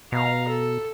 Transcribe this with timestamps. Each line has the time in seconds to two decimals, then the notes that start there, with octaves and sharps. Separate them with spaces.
0.12 B2 F5 A#5
0.48 A4